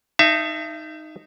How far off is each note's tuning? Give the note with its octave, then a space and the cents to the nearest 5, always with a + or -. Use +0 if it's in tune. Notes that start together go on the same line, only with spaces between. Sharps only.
D#4 +0 E5 +35 A5 +10